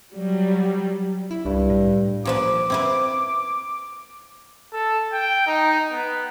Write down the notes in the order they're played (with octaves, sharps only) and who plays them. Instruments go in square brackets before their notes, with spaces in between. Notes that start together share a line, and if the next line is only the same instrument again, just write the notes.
[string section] F#3 G3
[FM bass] E4
[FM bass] C2 [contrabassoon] G2
[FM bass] A2
[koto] A#2 F3 B4 [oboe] D6
[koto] C4 E4 B4
[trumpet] A4
G5
D#4
B3